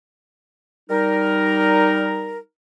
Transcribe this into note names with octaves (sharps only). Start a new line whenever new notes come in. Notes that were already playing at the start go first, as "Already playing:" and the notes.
G3 D#4 A#4